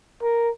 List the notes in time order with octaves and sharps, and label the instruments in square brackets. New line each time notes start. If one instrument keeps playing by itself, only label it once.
[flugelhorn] A#4